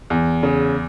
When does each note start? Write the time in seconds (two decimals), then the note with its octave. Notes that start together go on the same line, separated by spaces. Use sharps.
0.10 E2
0.43 C#3